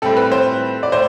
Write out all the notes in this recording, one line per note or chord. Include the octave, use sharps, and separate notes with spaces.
A2 G3 C4 A4
B4
C5
D5
A2 C5